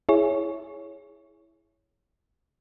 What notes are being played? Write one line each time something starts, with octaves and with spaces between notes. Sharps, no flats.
E4 G#4 C#5